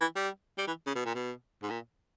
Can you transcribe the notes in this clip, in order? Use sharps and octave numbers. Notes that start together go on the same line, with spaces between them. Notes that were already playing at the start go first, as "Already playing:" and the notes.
E3
G3
G3
E3
C#3
B2
A#2
B2
G#2
A#2